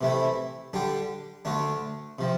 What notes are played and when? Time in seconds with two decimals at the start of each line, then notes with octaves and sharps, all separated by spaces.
0.01 C3 E3 A3 E4
0.73 D3 G3 D4 G4
1.45 D2 D3 A3 D4
2.19 C3 F3